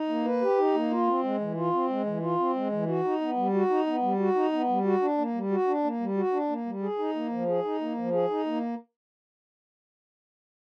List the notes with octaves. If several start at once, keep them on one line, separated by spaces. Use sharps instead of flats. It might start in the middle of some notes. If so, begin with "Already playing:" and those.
Already playing: D#4
A#3
B4
G4
D#4
A#3
F4
C4
G#3
E3
F4
C4
G#3
E3
F4
C4
G#3
E3
F#4
D#4
B3
G3
F#4
D#4
B3
G3
F#4
D#4
B3
G3
F#4
D4
A#3
G3
F#4
D4
A#3
G3
F#4
D4
A#3
G3
G#4
D#4
A#3
F3
G#4
D#4
A#3
F3
G#4
D#4
A#3